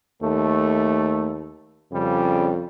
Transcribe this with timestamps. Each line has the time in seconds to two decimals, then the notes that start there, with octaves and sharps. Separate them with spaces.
0.22 D#2 A3
1.93 F2 C#3 G3